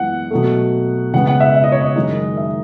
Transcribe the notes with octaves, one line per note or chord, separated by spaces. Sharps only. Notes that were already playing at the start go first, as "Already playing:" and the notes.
Already playing: F#2 E3 G#3 B3 F#5
B2 F#3 A3
C#3 G#3 B3 F#5
F#5
E5
E5
D#5
C#5
D#5
F#2 D#3 G#3 D#4
E5